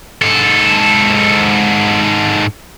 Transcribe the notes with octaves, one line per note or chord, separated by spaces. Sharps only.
G#2 A4